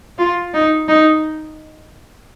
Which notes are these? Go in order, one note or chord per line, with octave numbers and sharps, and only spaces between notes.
F4
D#4
D#4